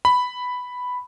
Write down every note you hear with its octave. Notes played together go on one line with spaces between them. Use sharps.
B5